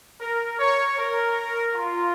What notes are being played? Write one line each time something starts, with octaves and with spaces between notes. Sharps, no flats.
A#4
C#5
A#4
F4